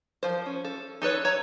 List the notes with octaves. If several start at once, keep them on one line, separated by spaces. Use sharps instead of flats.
F3 C5
C#4
A4
D#4 A4 B4 C#5
C#5 A#5